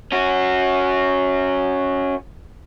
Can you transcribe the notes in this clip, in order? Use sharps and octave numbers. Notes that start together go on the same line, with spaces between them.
C#4 F#4